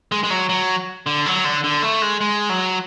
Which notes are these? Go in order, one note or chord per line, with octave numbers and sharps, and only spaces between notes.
G#3
G#3
F#3
F#3
D3
F#3
D3
D3
A3
G#3
G#3
F#3